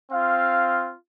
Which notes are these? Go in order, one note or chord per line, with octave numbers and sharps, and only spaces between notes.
C4 F4 F5